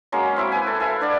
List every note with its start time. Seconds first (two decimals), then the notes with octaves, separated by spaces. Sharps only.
0.12 F#3 G#3 A#3 C#4
0.37 C4 E4 E5 D6
0.52 B4 G#5
0.67 A4
0.80 B4 E5 F5 G#5
1.01 D4 D5 F#5